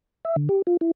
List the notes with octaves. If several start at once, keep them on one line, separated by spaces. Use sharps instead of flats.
E5
D3
G4
F4
E4